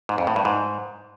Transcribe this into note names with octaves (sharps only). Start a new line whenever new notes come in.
G#2
F2
A2
G2
G#2